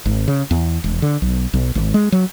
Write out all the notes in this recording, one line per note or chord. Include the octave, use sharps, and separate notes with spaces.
G#1
C#3
E2
E1
D3
B1
B1
G#1
G#3
F#3